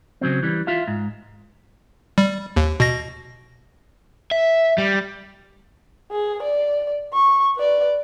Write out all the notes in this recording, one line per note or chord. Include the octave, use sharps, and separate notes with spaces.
C#3 F#3 C4
E3 G3
F4 E5 F5
G#2
G3
D#2
B2 A#6
E5
G3
G#4
D5
C#6
B4 D5